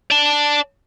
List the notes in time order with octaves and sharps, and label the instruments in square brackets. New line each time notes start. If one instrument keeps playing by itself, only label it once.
[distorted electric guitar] D5 A5